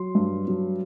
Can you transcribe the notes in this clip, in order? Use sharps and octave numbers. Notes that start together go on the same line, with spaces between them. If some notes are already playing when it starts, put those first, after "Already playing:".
Already playing: F#3 C6
G2
F#3